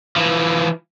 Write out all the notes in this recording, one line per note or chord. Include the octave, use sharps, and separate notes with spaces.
E3 F3